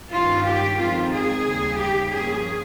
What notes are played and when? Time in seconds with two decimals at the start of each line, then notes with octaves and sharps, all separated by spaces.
0.11 G2 D#3 G3 C#4 F4
0.43 G4
0.77 F2 D#3 G#3 C4 F4
1.11 G#4
1.44 D#2 C#3 G3
1.78 G4
2.11 G2 F3 A#3 C#4 G#4